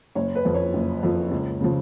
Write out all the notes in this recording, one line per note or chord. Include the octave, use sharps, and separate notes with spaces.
F#1 C#5
B4
F2 F3
C#5
F#1
F2 F3
C#2
C#3 F3